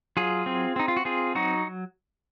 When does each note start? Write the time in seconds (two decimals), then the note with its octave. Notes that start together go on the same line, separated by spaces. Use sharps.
0.17 F#3 F4 G#4
0.46 C4
0.76 C4 D#4
0.88 F4
0.97 F#4
1.05 C4 F4 G#4
1.35 F#3 D#4 F#4